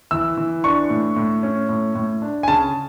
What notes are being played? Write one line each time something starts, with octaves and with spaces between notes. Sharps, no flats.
E3 E6
E3
D4 C#6
A2
A2
C#4
A2
A2
D4
G#5
C#3 A5